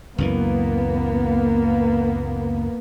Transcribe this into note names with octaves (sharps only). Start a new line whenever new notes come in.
C#2 F#2 E3 A#3 B3